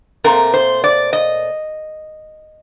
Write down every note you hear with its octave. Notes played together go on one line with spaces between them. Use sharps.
A#2 A3 C4 A#4
C5
D5
D#5